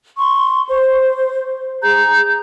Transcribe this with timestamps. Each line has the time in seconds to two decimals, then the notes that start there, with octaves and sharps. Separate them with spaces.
0.17 C6 C#6
0.68 C5
1.83 G#4 A#5 G6